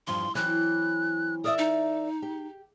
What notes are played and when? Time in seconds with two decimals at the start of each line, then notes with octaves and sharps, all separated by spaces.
0.07 E2 G2 F3 C6
0.35 E3 F#3 C4 F#6
1.44 A#4 D5 E5 D#6
1.58 D#4
2.22 G4